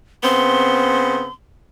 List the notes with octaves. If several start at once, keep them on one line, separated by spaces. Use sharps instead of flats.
C#3 B3 C4 C6